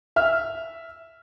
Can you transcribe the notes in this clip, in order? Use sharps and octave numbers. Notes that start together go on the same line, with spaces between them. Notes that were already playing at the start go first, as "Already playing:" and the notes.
E5 F6